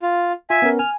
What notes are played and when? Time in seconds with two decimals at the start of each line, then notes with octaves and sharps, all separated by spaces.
0.02 F4
0.50 F4 E5 G#5
0.62 B3 C#4 A#4
0.79 G#5 F6